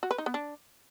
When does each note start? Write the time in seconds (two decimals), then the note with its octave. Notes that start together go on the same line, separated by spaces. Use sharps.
0.03 F#4
0.11 B4
0.18 D#4
0.26 B3
0.34 D4